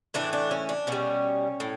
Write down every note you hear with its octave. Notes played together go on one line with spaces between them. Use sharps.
A2 E3 A3 D4
D4
C#4
D4
B2 G3 C#4
A2